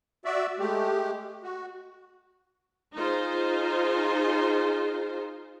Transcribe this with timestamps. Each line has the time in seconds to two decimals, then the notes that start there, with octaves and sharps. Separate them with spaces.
0.25 F#4 D5 E5
0.59 G#3 A3 G4
1.43 F#4
2.95 D#4 F4 G#4 C5